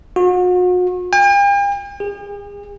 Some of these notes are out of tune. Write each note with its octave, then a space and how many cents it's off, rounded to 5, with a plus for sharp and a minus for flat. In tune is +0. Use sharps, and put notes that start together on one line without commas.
F#4 -40
G5 +45
G#4 -40